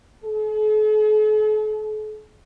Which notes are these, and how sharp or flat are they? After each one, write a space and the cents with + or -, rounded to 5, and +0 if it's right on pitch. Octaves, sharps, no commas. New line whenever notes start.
A4 -45